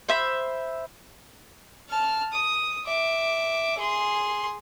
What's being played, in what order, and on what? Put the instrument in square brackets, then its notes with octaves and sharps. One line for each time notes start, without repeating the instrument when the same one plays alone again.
[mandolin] C5 E5 B5
[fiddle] A5 F6
D#6
E5 D6
G#4 C6